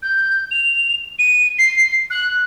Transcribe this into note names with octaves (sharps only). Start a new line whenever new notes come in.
G6
F7
D#7
C7
F#6